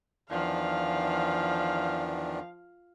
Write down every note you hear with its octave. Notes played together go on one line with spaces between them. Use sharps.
E2 D#3 F3 D4 F5